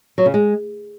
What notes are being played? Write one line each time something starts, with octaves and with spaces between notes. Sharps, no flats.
F#3
C#3
G#3